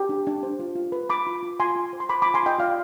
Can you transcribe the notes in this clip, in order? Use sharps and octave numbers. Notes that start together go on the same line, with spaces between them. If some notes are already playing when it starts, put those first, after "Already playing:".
Already playing: G4
D4
D4
C5
F4
F4
B4
B4 B5 D6
F4
F4
F4 G#5 C6
F4
C5
C6
C5 B5 D6
F4 B5 D6
G#5 C6
F4 D#5 G5
F4 D5 F5